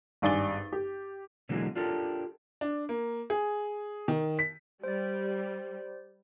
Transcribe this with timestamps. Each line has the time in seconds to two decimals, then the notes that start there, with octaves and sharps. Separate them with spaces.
0.22 G#1 G2 D5 G#5 A6 G7
0.72 G4
1.49 B2 D3 E3 F#3 G#3 A#3
1.75 D4 F4 G4 A4 A#4
2.61 D4
2.89 A#3
3.30 G#4
4.08 D#3
4.39 B6
4.83 G3 C5 D5